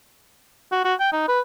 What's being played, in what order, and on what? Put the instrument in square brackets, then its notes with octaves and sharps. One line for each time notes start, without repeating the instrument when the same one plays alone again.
[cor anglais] F#4
F#4
G5
D#4
B4